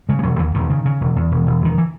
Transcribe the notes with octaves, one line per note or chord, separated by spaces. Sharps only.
C#3 G#3
G#3
E1 F#3
D#2 E3
E1 D#3
C#3
C#3
E1
E2
E1
E1
E1 D#3
E3